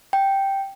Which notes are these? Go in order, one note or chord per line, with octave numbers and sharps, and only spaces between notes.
G5